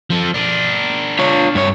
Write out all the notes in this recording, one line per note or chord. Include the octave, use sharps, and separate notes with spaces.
F3 A4
D4 A#4
F4 C#5
G2 C#5